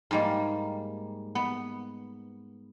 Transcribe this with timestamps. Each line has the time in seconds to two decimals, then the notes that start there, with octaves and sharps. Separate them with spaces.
0.11 G#2 G3 A#3
1.35 B3